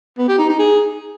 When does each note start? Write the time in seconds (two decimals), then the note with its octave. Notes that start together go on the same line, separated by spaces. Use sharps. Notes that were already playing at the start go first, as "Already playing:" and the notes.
0.18 B3
0.28 G4
0.38 D#4
0.49 D#4
0.59 G#4